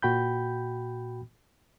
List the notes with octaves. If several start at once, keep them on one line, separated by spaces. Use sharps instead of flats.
A#2 F#4 G5 B5 G6